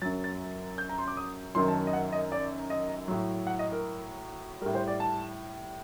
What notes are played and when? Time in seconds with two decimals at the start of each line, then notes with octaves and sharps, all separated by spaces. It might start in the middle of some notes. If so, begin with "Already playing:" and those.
0.02 F#2 F#3 A6
0.24 A6
0.78 G6
0.89 A#5
0.98 C6
1.08 D6
1.17 D#6
1.55 F#2 D#3 F#3 C6
1.68 A5
1.87 D#5
1.93 F#5
2.13 D#5
2.32 D5
2.70 D#5
3.08 A2 F#3
3.47 F#5
3.59 D#5
3.72 A#4
4.61 G3 A#4
4.66 A2
4.75 C5
4.88 D5
5.00 A5